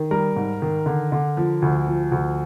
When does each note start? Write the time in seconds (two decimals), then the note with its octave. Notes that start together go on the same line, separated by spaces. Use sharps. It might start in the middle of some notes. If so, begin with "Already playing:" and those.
Already playing: D#3
0.11 G3 A#4
0.36 G#2
0.62 D#3
0.86 D3
1.12 D3
1.37 F3
1.62 D2
1.87 F3
2.12 D2